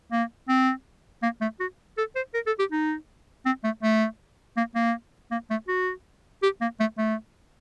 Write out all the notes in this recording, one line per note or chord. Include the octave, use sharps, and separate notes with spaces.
A#3
C4
A#3
A3
F#4
A4
C5
A#4
A4
G4
D#4
C4
A3
A3
A#3
A#3
A#3
A3
F#4
G4
A#3
A3
A3